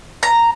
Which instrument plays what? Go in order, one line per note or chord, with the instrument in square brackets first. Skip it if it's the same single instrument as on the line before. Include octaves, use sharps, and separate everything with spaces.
[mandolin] A#5